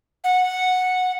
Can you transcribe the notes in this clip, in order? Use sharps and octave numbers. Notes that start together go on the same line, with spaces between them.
F#5